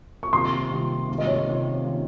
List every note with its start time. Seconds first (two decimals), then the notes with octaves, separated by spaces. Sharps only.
0.23 C#6
0.32 C3 D#3 G3 A#3 F4 C6
0.71 C3 D#3 G3 A#3 F4
1.08 C3 D#3 G3 A#3 F4
1.18 D#5
1.27 C#5
1.47 C3 D#3 G3 A#3 F4
1.84 D#3 A#3 C#4 F4